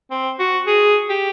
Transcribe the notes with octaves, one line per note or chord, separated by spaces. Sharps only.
C4
F#4
G#4
G4